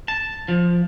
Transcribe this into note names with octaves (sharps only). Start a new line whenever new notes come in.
A5
F3